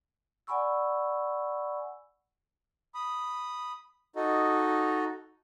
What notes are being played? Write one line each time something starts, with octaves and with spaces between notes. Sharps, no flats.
D5 F#5 G#5 B5 C#6 E6
B5 D#6
D#4 F#4 A4 D#5